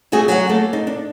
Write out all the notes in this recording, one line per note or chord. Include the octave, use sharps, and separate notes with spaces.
G3 A3 F#4 G#4
F#3 F#5
A3 A#3 A4
D#4
D4